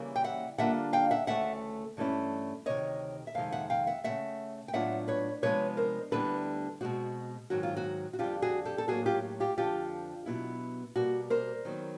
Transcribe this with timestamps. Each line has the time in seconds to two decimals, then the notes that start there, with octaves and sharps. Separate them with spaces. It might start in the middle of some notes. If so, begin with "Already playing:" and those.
Already playing: C#3 E3 G3 A#3
0.16 G5
0.24 E5 F#5
0.58 D3 G3 A#3 D4 F4 E5 F#5
0.93 F5 G5
1.11 E5 F#5
1.27 D2 C#3 E3 A3 E5 F#5
1.97 G2 E3 A3 C#4 E4
2.66 D2 C3 D#3 C#5 D#5
3.27 E5
3.35 F2 C3 D#3 G#3 F5
3.52 E5 F#5
3.70 F5 G5
3.87 E5 F#5
4.04 E3 A3 E5 F#5
4.09 C#3
4.68 G5
4.73 A2 F#3 B3 D4 F4 E5 F#5
5.08 B4 C#5
5.42 C3 F3 G#3 B3 D4 B4 C#5
5.77 A#4 C5
6.11 D2 D3 G3 B3 E4 A4 B4
6.81 B2 G#3 C4 F#4
7.50 G#2 D#3 F#3 F#4
7.63 F4
7.77 F#4
8.13 F#4
8.19 F2 D3 G3 F4 G4
8.42 F#4 G#4
8.65 G4 A4
8.78 A4
8.88 A2 F#3 A#3 F#4 G#4
9.06 F4 G4
9.40 F4 G4
9.57 F2 D3 F3 F4 G4
10.26 B2 F#3 B3 E4
10.96 B2 G3 A#3 F#4
11.30 A#4 C5
11.65 D#3 F#3 B3